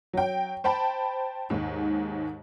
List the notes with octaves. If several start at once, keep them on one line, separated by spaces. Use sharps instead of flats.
F#3 G5
C5 G5 A5 B5
D#2 G#2